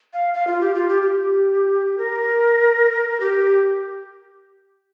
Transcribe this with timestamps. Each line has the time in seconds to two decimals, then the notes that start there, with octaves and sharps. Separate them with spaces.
0.13 F5
0.34 F5
0.47 F4
0.61 G4
0.75 F4
0.88 G4
1.02 G4
1.98 A#4
3.20 G4